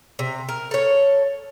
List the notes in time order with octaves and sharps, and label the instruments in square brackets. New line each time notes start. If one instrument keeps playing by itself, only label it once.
[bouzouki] C3
A#4
A4 C#5